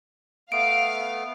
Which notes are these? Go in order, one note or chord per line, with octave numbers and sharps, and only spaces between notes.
A3 B3 F5 D7